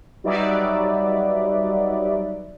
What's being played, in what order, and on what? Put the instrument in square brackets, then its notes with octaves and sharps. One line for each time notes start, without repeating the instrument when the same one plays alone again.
[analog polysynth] F#3 G3 D#4 B4 D5 E5